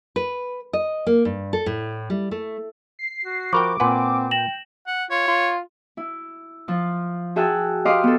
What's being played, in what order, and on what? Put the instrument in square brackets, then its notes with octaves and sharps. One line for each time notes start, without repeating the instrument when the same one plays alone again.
[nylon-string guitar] B4
D#5
A#3
G2
A4
A2
G3
A3
[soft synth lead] C7
[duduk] F#4
[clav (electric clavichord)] F3 A#4 G5 [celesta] B5 C#6 [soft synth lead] D6
[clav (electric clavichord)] A#2 B4 [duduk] C4 [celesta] F#5 G#5 C6
[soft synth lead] G5 [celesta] A#6 E7 F#7
[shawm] F#5
[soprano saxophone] F4 [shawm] C#5
[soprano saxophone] F4
[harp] E4
F3 F4
F#4 G#4 E5 G5 A5 F#6
G4 B4 D#5 F5 C6 D6
B3 A4